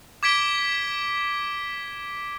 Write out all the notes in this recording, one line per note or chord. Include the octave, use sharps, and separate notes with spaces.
D6 G#6 B6 D7 G7